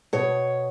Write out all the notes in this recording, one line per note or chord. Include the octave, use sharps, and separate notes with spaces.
B2 C#5